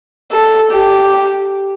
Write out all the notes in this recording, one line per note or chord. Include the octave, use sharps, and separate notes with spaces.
A4
G4